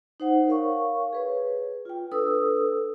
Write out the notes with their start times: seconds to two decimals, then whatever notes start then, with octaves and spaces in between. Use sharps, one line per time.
0.20 D#4 C5 F#5
0.47 A#4 C#5 F5 C#6
1.13 G#4 B4 C#5
1.85 F4 G5
2.12 D4 A4 B4 D#6 E6